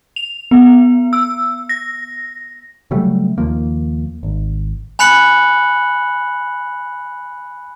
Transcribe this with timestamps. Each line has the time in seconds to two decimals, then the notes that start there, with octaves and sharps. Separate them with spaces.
0.16 F7
0.51 B3
1.13 E6
1.69 A#6
2.91 C#3 F#3 G3 A3
3.38 D#2 F3 A#3
4.23 G#1
4.99 G#5 B5 F#6 C#7 F#7